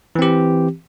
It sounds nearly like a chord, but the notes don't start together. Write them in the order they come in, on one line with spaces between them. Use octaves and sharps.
E3 C4 G4